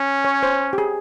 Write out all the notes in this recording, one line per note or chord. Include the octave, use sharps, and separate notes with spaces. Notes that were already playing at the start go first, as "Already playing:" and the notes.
Already playing: C#4
C#5
C5
G4
G#4